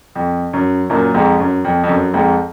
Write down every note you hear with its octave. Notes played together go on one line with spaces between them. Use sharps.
F2
F#2
F#2 A#2
F2 G#2
F#2
F2
F2
F#2
F2 G#2